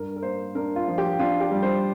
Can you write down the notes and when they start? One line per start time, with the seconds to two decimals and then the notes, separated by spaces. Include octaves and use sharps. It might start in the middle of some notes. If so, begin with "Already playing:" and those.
Already playing: G2 A#4
0.16 A#4
0.22 A#3 C5
0.55 D4 A#4
0.76 F4
0.88 F3
0.98 G4
1.19 D4 F4
1.40 G4
1.51 G3
1.63 C5